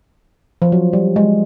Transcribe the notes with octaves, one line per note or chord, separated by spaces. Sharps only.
F3
F#3
G3
G#3